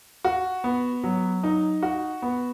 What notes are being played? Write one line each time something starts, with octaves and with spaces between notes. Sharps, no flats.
F#4
B3
F#3
D#4
F#4
B3